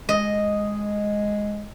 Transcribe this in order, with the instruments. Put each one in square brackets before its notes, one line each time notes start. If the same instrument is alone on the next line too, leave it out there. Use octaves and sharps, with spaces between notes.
[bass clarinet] G#3 [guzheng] D#5